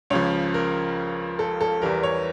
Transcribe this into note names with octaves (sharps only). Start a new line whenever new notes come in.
C#2 C#3 F3 C#5
A#4
A4
A4
E2 E3 G3 A#4
C#5